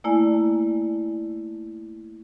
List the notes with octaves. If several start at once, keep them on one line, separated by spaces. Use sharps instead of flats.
A3 A#3 E4 D5 G#5